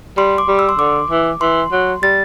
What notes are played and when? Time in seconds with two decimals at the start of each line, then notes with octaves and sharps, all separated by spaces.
0.17 G3 C6
0.38 D6
0.48 G3
0.59 E6
0.69 C6
0.79 D3 D6
1.10 E3
1.41 E3 C6
1.72 F#3
2.03 G3 A6